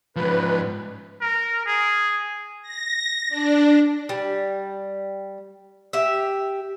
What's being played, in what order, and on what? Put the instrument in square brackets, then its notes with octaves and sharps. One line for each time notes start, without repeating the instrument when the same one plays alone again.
[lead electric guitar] G#2 F3 [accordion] B4
[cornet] A#4
G#4
[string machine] A#6
D4
[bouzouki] G3
G4 E5